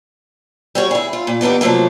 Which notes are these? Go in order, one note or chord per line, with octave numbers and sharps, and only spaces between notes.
G3 F#4 C#5
E4 G#4
F4
A#2
E2 B3 D4 D#4 G4
C3 F3 F#3 A3 A#3